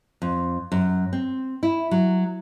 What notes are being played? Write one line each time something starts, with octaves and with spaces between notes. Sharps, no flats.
F2
F#2
C4
E4
F#3